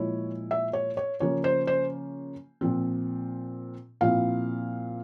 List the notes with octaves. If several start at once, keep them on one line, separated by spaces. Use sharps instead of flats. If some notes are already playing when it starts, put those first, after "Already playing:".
Already playing: A#2 F3 G#3 E4 C#5
E5
C#5
C#5
C#3 F3 A#3 C#5
C5
C5
A#2 F3 C4
A#2 F3 C4 E4 F5